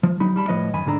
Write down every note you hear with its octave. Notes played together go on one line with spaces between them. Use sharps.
F3
F#3 D#4 B5
G3 A5 B5
A2 F3 B4 C#5 D#5
F#2 D#3 G#5 B5
D2 G#2 D#3 D4 A4 A#5